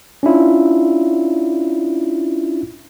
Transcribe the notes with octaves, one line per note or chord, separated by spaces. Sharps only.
C#4 D4 E4 F4